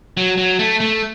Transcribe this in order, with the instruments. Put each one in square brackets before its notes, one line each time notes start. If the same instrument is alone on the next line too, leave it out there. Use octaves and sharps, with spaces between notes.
[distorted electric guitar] F#3
F#3
A3
A3